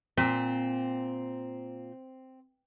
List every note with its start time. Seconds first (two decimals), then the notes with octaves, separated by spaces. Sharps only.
0.17 A#2 C4